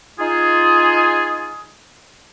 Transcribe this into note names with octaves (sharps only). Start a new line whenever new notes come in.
D#4 F4 G#4